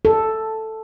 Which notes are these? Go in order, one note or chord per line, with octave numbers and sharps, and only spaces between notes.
A4